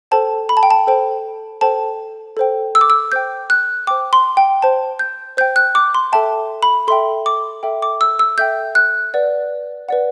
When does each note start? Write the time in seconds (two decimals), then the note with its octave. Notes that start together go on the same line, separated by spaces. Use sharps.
0.11 A4 C5 G5 A5
0.49 B5
0.57 A5
0.63 G5
0.70 A5
0.87 A4 C5 G5
1.61 A4 C5 G5 A5
2.37 A4 C5 G5
2.75 E6
2.81 D6
2.90 E6
3.12 C5 G5 G6
3.50 F#6
3.87 C5 G5 D6
4.13 C6
4.37 G5
4.62 C5 G5 A5
4.99 G6
5.37 C5 G5 G6
5.56 F#6
5.75 D6
5.95 C6
6.12 A4 E5 G5 A5
6.63 B5
6.88 A4 E5 G5 C6
7.26 D6
7.63 A4 E5 G5
7.82 D6
8.01 E6
8.19 E6
8.38 A4 E5 G5 G6
8.75 F#6
9.14 B4 D5 F#5
9.89 B4 D5 F#5